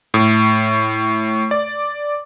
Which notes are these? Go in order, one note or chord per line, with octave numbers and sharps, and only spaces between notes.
A2
D5